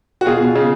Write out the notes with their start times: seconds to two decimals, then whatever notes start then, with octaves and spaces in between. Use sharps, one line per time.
0.21 F#4
0.26 B2 F4 G#4
0.41 B2
0.56 C#3